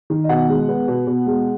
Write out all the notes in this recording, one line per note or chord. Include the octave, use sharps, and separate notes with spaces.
D#3
D#5
B2 F#5
G#3
B3
B2
B2
G#3